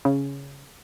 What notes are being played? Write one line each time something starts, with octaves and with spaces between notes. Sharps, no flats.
C#3